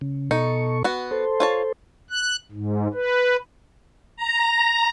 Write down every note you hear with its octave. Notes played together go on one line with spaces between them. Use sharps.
C#3
B2 D#4 A4 C#6
B3 F#4
A4 C5
F4 C#5 A5
F#6
G#2
B4
A#5